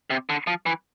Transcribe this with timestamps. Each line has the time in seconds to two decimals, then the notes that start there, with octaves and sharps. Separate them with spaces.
0.10 C3
0.30 D3
0.47 F3
0.66 E3